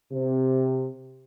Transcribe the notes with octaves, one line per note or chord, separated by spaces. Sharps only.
C3